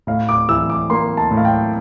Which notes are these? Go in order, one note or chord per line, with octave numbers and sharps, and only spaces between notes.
A2 F5
D6
E3 E6
D6
A#3 C6
A5
A2
F5
G5